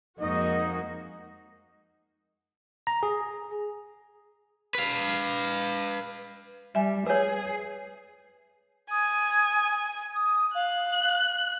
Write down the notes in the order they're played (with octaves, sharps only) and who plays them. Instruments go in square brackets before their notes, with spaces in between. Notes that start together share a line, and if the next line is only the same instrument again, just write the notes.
[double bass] F2 [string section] G#3 A#3 F#4 [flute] D#4 [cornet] D#5
[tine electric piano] A#5
G#4
[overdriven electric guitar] B4 F5
[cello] G3 [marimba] E5 G#5
[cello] G#4 [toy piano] B4 C#5 [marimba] G#5
[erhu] G#5 [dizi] D#6
[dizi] D#6
[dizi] F5 [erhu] F#6